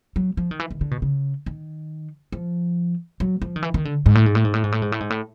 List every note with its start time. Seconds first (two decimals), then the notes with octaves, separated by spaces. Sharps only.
0.16 F#3
0.37 F3
0.51 D#3
0.60 E3
0.71 D#3
0.81 D3
0.91 B2
1.02 C#3
1.46 D#3
2.32 F3
3.20 F#3
3.42 F3
3.56 D#3
3.63 E3
3.74 D#3
3.85 D3
4.06 G#2
4.15 A2
4.26 G#2
4.35 A2
4.45 G#2
4.54 A2
4.64 G#2
4.72 A2
4.82 G#2
4.92 A2
5.00 G#2
5.10 A2